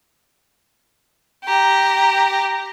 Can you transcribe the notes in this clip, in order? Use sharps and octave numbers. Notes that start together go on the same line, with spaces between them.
G4 A#5